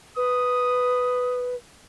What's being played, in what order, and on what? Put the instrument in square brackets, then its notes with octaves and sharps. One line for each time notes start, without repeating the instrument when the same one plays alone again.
[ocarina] B4 [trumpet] D#6